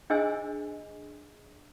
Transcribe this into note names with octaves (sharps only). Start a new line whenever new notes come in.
D4 G#4 C5 D#5 G#5 E6